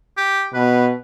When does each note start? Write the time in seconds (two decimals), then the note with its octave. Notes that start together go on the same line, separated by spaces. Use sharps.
0.17 G4
0.54 B2 B4